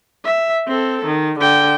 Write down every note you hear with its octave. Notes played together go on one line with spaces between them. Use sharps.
E5
C4 A4
D#3
D3 G5